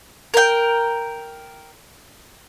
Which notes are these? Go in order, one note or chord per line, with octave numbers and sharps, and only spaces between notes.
A#4 G5